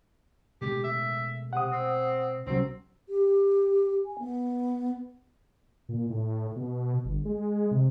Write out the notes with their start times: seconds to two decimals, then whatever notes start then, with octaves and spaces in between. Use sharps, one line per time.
0.61 B2 G#3 A3 G4
0.84 E5
1.53 C3 F#5 D#6
1.72 C4
2.47 C2 B2 F#3 C4 C#4
3.09 G4
4.05 G#5
4.19 B3
5.89 A#2
6.10 A2
6.56 B2
7.05 G1
7.25 G#3
7.71 C3